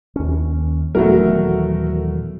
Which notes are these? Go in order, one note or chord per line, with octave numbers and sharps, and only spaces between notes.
D#2 C#4
D#1 E3 F#3 A3 B3 F#4 A#4